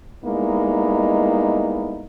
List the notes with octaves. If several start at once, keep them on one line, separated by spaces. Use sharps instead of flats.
G3 G#3 A#3 B3 D#4 E4